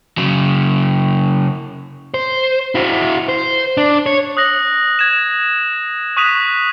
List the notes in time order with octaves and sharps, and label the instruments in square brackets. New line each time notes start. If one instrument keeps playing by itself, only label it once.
[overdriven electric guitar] C#3 F#3
[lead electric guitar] C5
E4 F#4
C5
D4
C#5
[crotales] D#6 F#6 A#6 F#7
G#6 E7
C#6 D#6 F#6 B6 D#7 F7